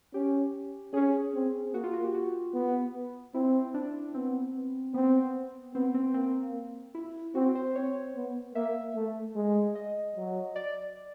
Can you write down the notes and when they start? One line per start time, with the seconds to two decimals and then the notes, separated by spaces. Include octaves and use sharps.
0.14 C#4 G4
0.93 C#4 G#4
1.34 C4
1.74 A#3 F#4
1.84 F4
1.93 F#4
2.04 G4
2.14 F#4
2.54 B3
3.34 C4 E4
3.74 D4
4.14 B3 C4
4.94 B3 C4
5.74 B3 C4
5.94 C4
6.14 A#3 C4
6.95 E4
7.35 C4 F#4
7.55 C5
7.75 C4 C#5
8.16 B3
8.55 A#3 E5
8.95 A3
9.36 G#3
9.75 D#5
10.16 F#3
10.56 D5